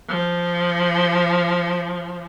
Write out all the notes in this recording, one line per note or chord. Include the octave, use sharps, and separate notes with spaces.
F3